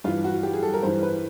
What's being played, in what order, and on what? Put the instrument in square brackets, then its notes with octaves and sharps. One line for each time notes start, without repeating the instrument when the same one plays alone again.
[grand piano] G2 E3 F4
F#4
G4
G#4
A4
A#4
G2 E3 C5
B4